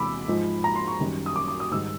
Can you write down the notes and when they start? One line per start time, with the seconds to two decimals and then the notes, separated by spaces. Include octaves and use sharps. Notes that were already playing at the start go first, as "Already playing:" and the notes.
Already playing: E2 C3 E3 G#3 B5 D6 E6
0.28 G#2 F3 G#3
0.64 A#5
0.76 C6
0.88 C#6
1.00 F#2 D#3 G3
1.26 D#6
1.36 D6
1.48 D6
1.60 D#6
1.71 G#2 D#3 G3 E6